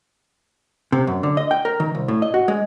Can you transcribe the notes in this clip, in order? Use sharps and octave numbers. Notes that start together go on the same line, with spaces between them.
C3
F#2
D3
D#5
G5
A#4
D#3
C2
A2
D#5
F#4
G#3